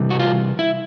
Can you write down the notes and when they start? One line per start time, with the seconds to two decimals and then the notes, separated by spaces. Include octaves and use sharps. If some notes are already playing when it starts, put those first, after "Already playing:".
Already playing: C3 E3 G3
0.10 F#4
0.19 F4
0.59 E4